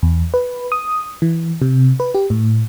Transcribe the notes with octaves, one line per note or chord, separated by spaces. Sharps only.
E2
B4
D#6
E3
C3
B4
G4
A2